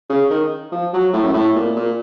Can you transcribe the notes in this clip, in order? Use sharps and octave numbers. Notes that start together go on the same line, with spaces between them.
C#3
D#3
F3
F#3
A2
F#2
A2
A#2
A#2